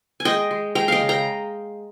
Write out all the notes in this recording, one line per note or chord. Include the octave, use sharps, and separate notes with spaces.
G#5
G#3 D#5 G5
G#3
G#3 G5 A#5
D#5 F5 G5
C#3
G5 A#5